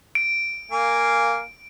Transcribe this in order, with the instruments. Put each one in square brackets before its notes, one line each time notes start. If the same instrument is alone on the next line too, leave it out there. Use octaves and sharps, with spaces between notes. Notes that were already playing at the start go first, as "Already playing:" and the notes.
[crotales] D7
[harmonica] A#3 F5 G#5